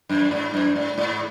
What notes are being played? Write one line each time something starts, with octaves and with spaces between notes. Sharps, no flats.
F#2
G#2
F#2
G#2
G#2